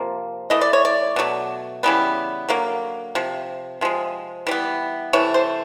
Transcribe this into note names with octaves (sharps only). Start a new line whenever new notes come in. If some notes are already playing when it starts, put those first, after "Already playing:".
Already playing: C3 F3 A#3
E3 A3 D#5
D5
C#5
D5
B2 F#3 A3
C#3 E3 G3 B3
D3 F#3 A#3
C3 F3
C3 F3 G#3
E3 G3 B3
C3 E3 A3 C#5
C5